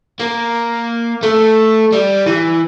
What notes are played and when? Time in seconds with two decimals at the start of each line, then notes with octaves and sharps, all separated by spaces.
0.20 A#3
1.23 A3
1.92 G3
2.26 E3